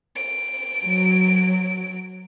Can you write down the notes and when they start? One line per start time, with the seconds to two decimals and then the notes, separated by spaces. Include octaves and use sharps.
0.16 D7
0.83 F#3